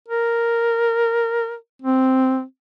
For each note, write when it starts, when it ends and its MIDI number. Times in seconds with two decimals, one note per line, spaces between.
0.08 1.55 70
1.82 2.42 60